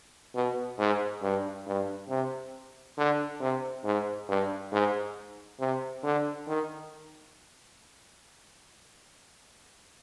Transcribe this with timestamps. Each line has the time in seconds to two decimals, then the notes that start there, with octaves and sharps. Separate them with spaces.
0.35 B2
0.78 G#2
1.22 G2
1.66 G2
2.09 C3
2.97 D3
3.40 C3
3.84 G#2
4.28 G2
4.72 G#2
5.60 C3
6.03 D3
6.47 D#3